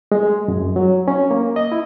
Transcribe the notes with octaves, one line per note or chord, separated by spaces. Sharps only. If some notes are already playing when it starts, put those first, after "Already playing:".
G#3
F#2
F#3
C#4
A#3
D#5
E4